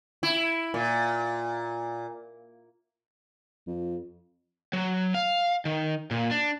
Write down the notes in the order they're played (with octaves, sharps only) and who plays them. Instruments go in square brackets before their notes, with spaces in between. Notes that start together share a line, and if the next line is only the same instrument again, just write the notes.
[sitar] E4
A#2
[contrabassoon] F2
[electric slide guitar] F#3
F5
D#3
A#2
D4